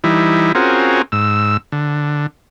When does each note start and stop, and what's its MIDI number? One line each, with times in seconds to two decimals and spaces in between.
0.04 0.52 52
0.04 0.52 55
0.04 0.52 63
0.04 0.52 64
0.55 1.02 60
0.55 1.02 61
0.55 1.02 65
0.55 1.02 66
0.55 1.02 68
0.55 1.02 70
1.12 1.57 44
1.12 1.57 88
1.72 2.27 50